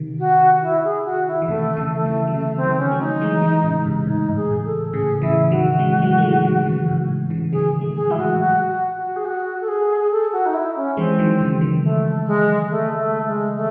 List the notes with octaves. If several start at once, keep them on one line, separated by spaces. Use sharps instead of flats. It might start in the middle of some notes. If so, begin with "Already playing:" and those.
Already playing: C3 D#3
F#4
E4
G#4
F#4
E4
E3
C3 D#3 A3
C#3 E3
A3
C#3 E3
F#3
C#3 E3 A3
C4
D#3 F#3
C#4
F#3 A3
D#4
E3 G#3
E3 G#3
A2 C#3
G#2 C3
A2 D#4
G#2
G#4
A2
A4
A2 C#3 G#4
C#3 E3 E4
D#3 F#3 F#4
E3 G#3
E3 G#3
A3
E3 G#3
D#3 F#3
C#3 E3
G#2
A2
C#3 E3
D#3 F#3 G#4
F#3 A3
G#4
E3 G#3 E4
F#4
F#4
F#4
F#4
G#4
F#4
A4
G#4
G#4
A4
F#4
D#4
E4
C#4
E3 G#3 C4
D#3 F#3
C#3 E3
D#3 F#3
A3
G#3
A3
A3
G#3
A3